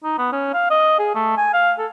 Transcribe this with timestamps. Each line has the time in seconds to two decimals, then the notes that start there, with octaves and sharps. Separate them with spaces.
0.04 D#4
0.18 B3
0.32 C#4
0.53 F5
0.70 D#5
0.99 G#4
1.15 A3
1.37 G#5
1.53 F5
1.78 A4